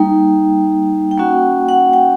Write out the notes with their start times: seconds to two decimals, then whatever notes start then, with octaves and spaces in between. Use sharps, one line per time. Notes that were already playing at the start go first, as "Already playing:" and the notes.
Already playing: G3 A#3 D#4 G5
1.11 G5
1.17 A#3 C#4 F#4 F#5
1.69 F#5
1.93 G5